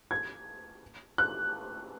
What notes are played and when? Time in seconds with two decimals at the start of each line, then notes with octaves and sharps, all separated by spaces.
0.11 G#6
1.18 F#6